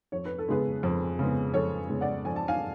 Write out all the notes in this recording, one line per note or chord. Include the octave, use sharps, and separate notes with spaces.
F2 C#5
B4
A4
C#3 G#3 B3 G#4 B4
F2
C#3 G#3 B3
F2 A4 C#5
C#3 G#3 B3
D5 F#5
F2 G#5
A5
F5 G#5